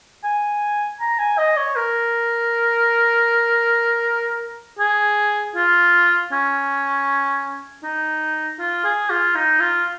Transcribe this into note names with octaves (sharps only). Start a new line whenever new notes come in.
G#5
A#5
G#5
D#5
C#5
A#4
G#4
F4
C#4
D#4
F4
G#4
F4
D#4
F4